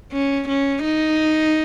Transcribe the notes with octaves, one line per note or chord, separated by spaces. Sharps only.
C#4
C#4
D#4